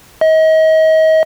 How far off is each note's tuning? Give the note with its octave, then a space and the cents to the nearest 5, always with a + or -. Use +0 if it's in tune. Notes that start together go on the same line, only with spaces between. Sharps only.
D#5 +35